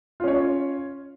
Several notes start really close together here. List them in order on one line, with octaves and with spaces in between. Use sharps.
F4 C#4 C#5